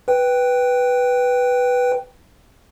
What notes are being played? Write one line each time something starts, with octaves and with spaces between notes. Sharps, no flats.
B4 G5